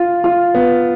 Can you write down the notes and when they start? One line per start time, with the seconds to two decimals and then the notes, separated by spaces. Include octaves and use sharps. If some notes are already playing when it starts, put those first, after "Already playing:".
Already playing: F4
0.24 F4
0.54 B3